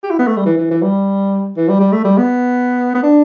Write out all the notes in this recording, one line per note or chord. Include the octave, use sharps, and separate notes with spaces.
G4
E4
B3
A3
G3
E3
E3
E3
G3
E3
G3
G3
A3
G3
B3
B3
D4